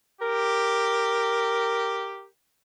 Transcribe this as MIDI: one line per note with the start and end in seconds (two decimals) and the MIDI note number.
0.21 2.27 67
0.21 2.27 70